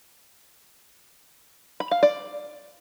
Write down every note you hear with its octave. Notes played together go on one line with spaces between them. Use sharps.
B5
F5
D5